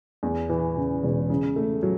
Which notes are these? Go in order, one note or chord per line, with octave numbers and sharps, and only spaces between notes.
E2
E3
C#3
E1
C#3
A3
F#3